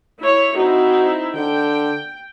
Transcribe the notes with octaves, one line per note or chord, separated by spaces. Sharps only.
E4 C#5
C4 D#4 E4 F#4
D3 G5